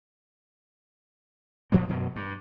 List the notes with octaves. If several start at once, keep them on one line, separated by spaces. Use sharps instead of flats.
A#2 F3 F#3 A#3
F#2 B2 F#3
G2